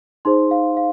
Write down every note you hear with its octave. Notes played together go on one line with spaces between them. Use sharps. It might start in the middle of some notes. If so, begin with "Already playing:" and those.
D#4 G#4 C5 C6
F5
F5